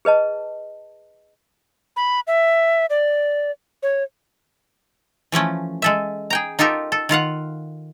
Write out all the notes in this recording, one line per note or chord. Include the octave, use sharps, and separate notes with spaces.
G#4 B4 D#5 A5
B5
E5
D5
C#5
E3 F3 A3 C#4
G#3 A4 E5
G#4 G5 A#5
D#4 F4 G4 A4 A#4
A4
D#3 F4 F5 F#5